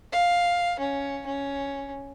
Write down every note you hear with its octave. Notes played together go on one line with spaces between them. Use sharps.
F5
C#4
C#4